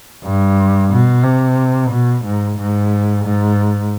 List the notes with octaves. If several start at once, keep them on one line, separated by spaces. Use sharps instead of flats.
G2
B2
C3
B2
G#2
G#2
G#2